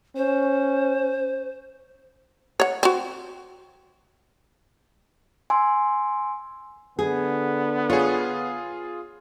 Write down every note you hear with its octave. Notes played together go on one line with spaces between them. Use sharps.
C#4 C5
C#5 F#5
C4 F#4
G#5 C6 E6
D3 B3 G#4
F4 G#4 C#5